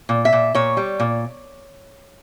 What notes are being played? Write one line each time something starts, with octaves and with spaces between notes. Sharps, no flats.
A#2
E5
A#2
A#2 C#5
G3
A#2